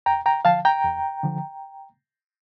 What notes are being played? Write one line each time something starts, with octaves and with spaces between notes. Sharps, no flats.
E2 G5 A#5
G5 A#5
D3 F3 F5 A5
G5 A#5
E2
D3 F3